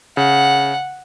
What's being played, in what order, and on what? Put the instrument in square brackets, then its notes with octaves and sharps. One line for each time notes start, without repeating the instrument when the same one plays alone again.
[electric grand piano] C#3 [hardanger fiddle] F#5